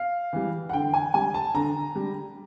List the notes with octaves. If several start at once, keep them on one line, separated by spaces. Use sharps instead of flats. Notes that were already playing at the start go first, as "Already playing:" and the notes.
Already playing: F5
E3 G3
F#5
D3 G5
G#5
G3 G#5
A5
D3 A#5
G3